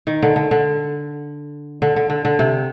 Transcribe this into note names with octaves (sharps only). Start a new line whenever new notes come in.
D#3
D3
D3
D3
D3
D3
D3
D3
C3